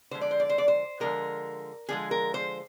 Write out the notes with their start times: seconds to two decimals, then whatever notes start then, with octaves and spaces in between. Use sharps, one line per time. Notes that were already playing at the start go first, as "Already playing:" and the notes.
0.11 D3 F3 G#3 C5
0.21 D5
0.31 C5
0.40 D5
0.50 C5
0.58 D5
0.68 C5
1.00 D3 F3 G#3 A#4
1.89 D3 F3 G#3 G#4
2.11 A#4
2.34 C5